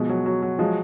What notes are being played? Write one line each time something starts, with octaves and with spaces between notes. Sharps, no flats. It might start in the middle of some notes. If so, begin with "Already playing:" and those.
Already playing: B2 F3 G#3
F#3
F#3
F#3
F3 F#3 G#3